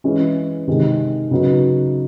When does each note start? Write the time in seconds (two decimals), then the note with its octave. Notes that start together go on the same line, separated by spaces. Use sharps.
0.04 E3 G#3 C#4
0.68 C3 D#3 G#3
1.31 C#3 F#3 B3 D#4